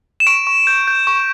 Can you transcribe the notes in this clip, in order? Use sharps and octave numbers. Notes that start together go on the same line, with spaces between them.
E7
C#6 D7
C#6
G6
G6
C#6